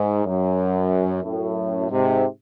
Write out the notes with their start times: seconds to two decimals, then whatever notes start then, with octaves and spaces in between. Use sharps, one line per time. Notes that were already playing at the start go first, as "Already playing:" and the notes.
Already playing: G#2
0.25 F#2
1.24 F#2 A2
1.90 G#2 C3